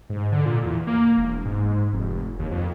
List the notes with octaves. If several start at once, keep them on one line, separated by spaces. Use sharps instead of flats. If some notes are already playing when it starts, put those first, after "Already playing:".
G#2
D3
A#2
E2
A#3
E1
G#2
F1
D#2
F2